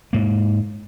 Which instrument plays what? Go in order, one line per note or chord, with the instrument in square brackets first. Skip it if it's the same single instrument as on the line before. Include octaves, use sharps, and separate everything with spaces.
[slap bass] G#2 A#3